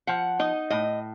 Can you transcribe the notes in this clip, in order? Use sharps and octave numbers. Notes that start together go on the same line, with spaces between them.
F3 F#5
D#4 D#5
A2 D#5